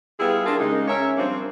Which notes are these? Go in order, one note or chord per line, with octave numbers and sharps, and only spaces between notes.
G3 B3 E4 F4 G#4
D4 F4 A#4
C#3 G#3 A#3 D#4
C#4 A#4 C#5 E5
F3 G3 A#3 C4 D4 F4